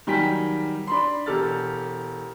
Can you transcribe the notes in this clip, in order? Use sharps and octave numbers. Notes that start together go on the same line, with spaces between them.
D#3 F#3 G3 G5 G#5 B6
D4 B5 C6
E1 G4 A4 F6 A6